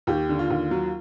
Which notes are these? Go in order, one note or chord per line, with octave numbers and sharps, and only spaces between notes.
D#2 G4
D3
F4
D#2
F#3